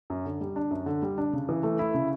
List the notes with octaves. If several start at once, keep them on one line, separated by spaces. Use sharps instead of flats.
F#2
D3
G3
D4
F#2
D3
G3
D4
C#3
E3
A3
E4
C#3